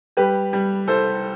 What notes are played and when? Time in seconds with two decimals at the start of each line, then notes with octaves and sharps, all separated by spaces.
0.17 G3 G4 B4
0.53 G3
0.87 C2 A4 C5